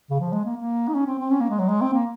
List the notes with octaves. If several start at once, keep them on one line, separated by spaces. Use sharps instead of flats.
C#3
F3
G#3
A#3
A#3
D#4
C#4
C4
C4
C#4
A#3
G#3
F#3
G#3
C4
A#3